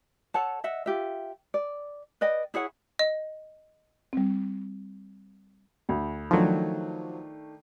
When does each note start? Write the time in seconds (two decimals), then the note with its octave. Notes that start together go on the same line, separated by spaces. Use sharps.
0.34 A4 C#5 F#5 A5
0.64 D#5 E5 F#5
0.86 F4 G4 E5
1.54 D5
2.21 B4 D5 D#5 G5
2.54 E4 G#4 C#5 F#5
2.99 D#5
4.13 G3 C4
5.89 D2
6.31 D#3 F3 F#3 A3 D4